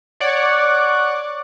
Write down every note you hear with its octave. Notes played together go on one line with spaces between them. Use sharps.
C#5 D5 F#5